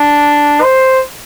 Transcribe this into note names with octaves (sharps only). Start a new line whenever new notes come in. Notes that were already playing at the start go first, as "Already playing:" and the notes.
Already playing: D4
C5